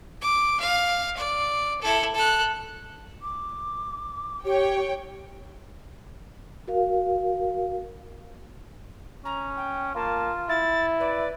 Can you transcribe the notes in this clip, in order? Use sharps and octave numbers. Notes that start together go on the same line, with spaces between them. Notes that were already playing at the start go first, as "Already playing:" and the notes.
D6
F5
D5
E4 A4
A4 F#6
D6
G4 C#5 G5
F#4 A#4 F5
C#4 A#5
G5
A#3 F4 A5
E4 A6
B4 D5